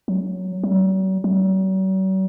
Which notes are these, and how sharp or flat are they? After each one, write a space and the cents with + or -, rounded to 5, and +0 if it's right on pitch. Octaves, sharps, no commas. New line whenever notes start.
F#3 +5
F#3 +45
F#3 +45